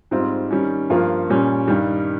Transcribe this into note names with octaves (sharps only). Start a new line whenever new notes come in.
G#2 G3 C4 F4
D#3 G3 C#4
G2 F3 A#3 F4
A#2 G3 C#4
G2 D#3 G3